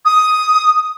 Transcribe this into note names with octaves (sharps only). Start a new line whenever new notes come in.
D#6